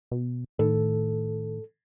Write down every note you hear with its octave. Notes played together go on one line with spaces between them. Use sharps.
B2
A2 D#3 A4